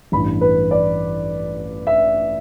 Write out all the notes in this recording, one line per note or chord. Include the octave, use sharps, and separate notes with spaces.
A1 G2 E3 B5
B4
D5
E5